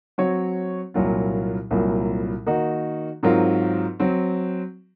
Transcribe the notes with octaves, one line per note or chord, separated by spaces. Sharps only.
F#3 C4 F#4 C#5
C2 A#2 F#3 A#3 F4
C2 A#2 F#3 A#3
D#3 A#3 D#4 F#4
G#2 F#3 C4 F4 A#4
F#3 C4